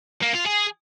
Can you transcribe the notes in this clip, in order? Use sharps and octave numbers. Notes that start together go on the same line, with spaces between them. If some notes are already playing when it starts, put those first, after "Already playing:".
A#3
F4
G#4